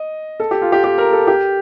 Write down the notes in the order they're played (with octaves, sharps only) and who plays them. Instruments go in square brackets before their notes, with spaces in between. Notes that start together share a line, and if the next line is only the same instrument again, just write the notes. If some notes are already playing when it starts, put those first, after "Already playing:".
Already playing: [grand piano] D#5
A4
G4
F4
G4
G4
A#4
A4
G4